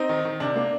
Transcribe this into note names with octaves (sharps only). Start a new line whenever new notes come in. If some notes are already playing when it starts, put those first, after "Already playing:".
Already playing: C4 D#4
D#3
D#3
C3 D4
A#3